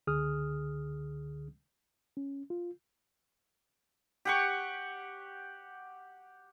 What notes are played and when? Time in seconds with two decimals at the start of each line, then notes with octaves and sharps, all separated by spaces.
0.07 C#2 D3 G#4 D#6 F6
2.17 C#4
2.50 F4
4.25 G4 F#5 C#6